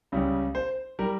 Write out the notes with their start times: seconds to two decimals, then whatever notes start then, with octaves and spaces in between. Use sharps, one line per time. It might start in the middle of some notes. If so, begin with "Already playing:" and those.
0.12 C#2 C#3 G3
0.55 C5
0.99 G3 A#4